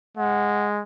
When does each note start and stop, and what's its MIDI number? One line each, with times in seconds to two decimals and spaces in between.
0.17 0.82 56
0.17 0.64 78